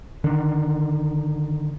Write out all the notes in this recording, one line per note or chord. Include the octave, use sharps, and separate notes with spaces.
D3 D#3 D4